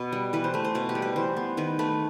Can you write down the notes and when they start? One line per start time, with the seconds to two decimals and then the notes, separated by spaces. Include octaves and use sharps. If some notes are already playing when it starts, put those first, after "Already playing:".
Already playing: B2 B4
0.12 G3
0.33 E3 B4
0.44 C5
0.54 A3 B4
0.64 C5
0.75 B2 B4
0.89 G4
0.95 G3
1.02 B4
1.16 E3 C5
1.37 B3
1.57 D#3 B4
1.79 A3 B4